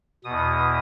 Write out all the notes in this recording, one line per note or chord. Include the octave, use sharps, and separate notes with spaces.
E2 B2 D#6